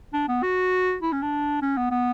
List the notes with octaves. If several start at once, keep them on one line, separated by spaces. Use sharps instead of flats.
D4
B3
F#4
E4
C#4
D4
C#4
B3
B3